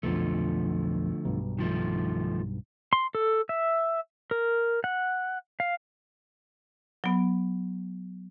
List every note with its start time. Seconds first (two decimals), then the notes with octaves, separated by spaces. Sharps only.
0.03 B1 F2 D3 F3 A3
1.25 B1 G2
1.58 D#3 F3 A3
2.93 C6
3.15 A4
3.49 E5
4.31 A#4
4.84 F#5
5.60 F5
7.04 F#3 B3